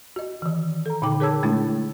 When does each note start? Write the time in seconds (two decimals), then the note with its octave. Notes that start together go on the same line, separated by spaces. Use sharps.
0.16 F#4 D#5
0.42 D#3 E3
0.86 A4 A#5
1.02 A#2 D3 D#4 G5 D6
1.20 G#4 A#4 C#5 A5 E6 G#6
1.43 A#2 G#3 A3 D4 E4